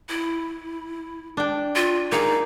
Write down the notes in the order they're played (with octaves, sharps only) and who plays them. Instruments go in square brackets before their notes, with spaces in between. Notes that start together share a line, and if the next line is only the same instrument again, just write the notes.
[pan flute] E4
[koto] D4 G5
[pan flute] F4
[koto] A#3 G#4 [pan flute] D#4